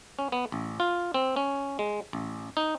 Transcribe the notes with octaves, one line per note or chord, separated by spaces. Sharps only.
C#4
B3
A1
F4
C4
C#4
G#3
A1
D#4